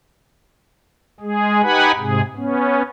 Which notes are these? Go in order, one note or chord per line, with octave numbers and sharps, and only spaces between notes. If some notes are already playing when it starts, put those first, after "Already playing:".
G#3 G#4
D#4 G4 B4 F#5 G#5 B5
G#2 C3 G#4
B3 C#4